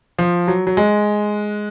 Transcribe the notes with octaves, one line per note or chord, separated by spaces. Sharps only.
F3
F#3
F#3
G#3